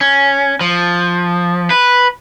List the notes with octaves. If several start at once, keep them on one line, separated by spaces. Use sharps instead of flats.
C#4
F3
B4